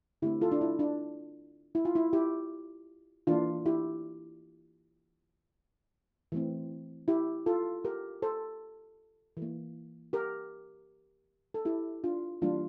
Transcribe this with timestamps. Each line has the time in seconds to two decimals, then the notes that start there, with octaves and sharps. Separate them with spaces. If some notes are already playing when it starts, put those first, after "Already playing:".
0.22 D3 A3 C4 E4 G4
0.42 F4 A4
0.52 D4
0.61 E4
0.79 D4
1.75 E4
1.85 F4
1.95 E4
2.13 E4 G4
3.27 E3 A#3 D4 F4
3.66 E4 G4
6.32 E3 A3 C4
7.08 E4 G4
7.46 F4 A4
7.85 G4 A#4
8.22 A4 C5
9.37 E3
9.42 A#3
10.13 G4 A#4
11.54 A4
11.65 E4 G4
12.04 D4 F4
12.42 E3 G3 A#3 D4 F4